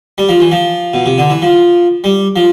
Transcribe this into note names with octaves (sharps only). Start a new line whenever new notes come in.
G3
F3
E3
F3
B2
C3
D3
E3
F3
G3
F3